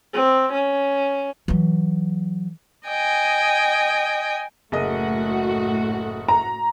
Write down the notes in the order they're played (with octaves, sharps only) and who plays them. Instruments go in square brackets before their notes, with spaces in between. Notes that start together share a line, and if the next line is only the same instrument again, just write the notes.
[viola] C4
C#4
[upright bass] E3 F#3
[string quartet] D#5 G5 G#5
[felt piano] F#1 G#4 D#5 [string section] A2 A3 F#4
[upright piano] A#5